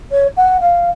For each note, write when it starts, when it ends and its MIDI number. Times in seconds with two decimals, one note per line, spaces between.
0.11 0.27 73
0.37 0.57 78
0.60 0.89 77